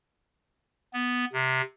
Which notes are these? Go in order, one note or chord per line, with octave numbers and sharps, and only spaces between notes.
B3
C3